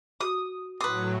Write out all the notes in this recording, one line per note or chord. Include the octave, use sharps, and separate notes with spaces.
F#4 D#6
A2 F#3 B4 C6 D#6